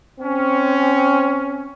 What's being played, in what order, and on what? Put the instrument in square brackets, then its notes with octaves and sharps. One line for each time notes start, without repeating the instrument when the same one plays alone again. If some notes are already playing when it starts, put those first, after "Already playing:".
[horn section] C4 C#4